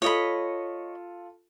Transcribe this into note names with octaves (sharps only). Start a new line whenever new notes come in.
F4 A4 C#5 D#5 B5